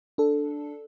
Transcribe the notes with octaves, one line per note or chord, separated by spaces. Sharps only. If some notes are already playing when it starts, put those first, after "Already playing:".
D4 A4